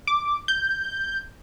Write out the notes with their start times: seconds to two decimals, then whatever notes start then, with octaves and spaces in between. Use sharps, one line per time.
0.07 D6
0.48 G6